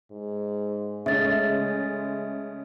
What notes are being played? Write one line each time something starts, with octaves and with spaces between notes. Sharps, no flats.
G#2
C#3 G#3 A3 E5 A6